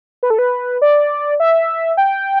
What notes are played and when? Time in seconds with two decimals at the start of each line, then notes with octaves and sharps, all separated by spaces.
0.23 B4
0.30 A4
0.39 B4
0.82 D5
1.40 E5
1.97 G5